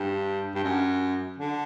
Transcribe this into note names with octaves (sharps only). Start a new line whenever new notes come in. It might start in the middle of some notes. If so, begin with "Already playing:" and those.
Already playing: G2
G2
F#2
D3